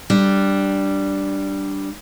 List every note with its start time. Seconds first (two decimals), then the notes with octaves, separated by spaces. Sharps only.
0.10 G3 D4